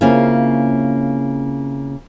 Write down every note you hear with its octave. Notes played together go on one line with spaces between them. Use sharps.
C#3 A#3 C4 C#4 E4 F4